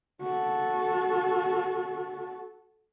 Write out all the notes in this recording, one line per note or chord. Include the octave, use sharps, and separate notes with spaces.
F#4 A4